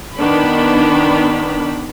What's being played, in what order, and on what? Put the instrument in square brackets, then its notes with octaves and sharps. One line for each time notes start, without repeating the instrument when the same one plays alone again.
[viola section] D#3 B3 D4 B5